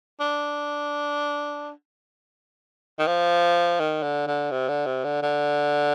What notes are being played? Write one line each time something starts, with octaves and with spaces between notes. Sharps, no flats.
D4
D#3
F3
D#3
D3
D3
C3
D3
C3
D3
D3